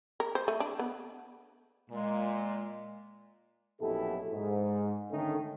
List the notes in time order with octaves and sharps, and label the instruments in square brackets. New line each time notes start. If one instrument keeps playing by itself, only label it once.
[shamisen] A#4
C5
A3
D4
B3
[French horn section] A#2 [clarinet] G#3
[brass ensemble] A#1 F#2 B2 E4 G4 A4
G#2
D3 D#3 A3 C#4 D#4 A4